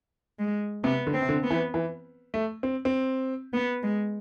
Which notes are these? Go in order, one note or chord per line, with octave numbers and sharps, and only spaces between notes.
G#3
C3 B3
D3
C4
C3
D3
B3
E3
E3
A3
C4
C4
B3
G#3